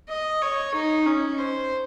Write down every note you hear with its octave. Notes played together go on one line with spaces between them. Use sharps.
D#5
C#5
D#4
C#4
C5